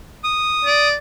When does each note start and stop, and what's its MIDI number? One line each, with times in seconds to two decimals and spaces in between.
0.24 0.88 87
0.65 0.95 74